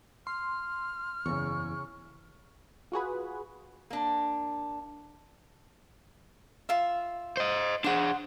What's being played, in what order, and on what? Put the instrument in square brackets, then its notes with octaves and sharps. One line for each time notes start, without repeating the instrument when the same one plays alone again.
[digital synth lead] C6 [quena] F6
[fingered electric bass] F#1 E2 [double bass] C#3 [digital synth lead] C#6
[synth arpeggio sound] F4 F#4 G#4 B4
[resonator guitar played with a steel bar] A#3 D4
[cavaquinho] F4 E5
[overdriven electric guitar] C5 D#5
[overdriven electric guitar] D4 G#4 [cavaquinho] C5 F#5